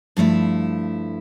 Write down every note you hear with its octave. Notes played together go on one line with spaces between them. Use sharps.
G2 F3 A3 E4